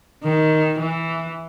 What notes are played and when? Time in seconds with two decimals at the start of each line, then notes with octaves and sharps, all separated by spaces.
0.24 D#3
0.79 E3